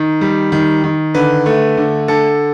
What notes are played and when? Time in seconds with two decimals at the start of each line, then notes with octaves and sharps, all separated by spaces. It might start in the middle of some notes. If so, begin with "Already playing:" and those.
Already playing: D#3
0.21 G3
0.52 D#3
0.84 D#3
1.14 D3 B4
1.46 A3
1.77 D3
2.08 D3 A4